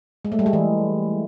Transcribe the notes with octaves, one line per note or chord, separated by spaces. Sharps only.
G#3
A3
G3
G#3
E3